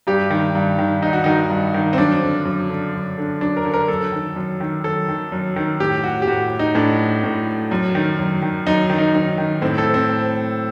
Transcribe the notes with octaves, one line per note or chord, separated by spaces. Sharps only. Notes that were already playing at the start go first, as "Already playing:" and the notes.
G2 G4
D#3
G2
D#3
G2 D#4
F#4
D#3 D#4
G2
D#3
C4
F#2 D4
D3
F#2
D3
F#2
D3
F#2 D4
A#4
D3
A#4
F#2 A4
D#3
F#2
D#3
F#2 A4
D#3
F#2
D#3
A2 G4
F#4
G4
A2 F#4
D#4
A2 D4
A2
F#2
D#3
F#2
D#3
F#2 D#4
D#3
D#4
F#2 D#4
D#3
A2 C4
A4
C4
A2